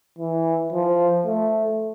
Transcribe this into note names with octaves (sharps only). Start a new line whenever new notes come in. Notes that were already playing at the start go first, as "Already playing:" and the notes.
E3
F3
A3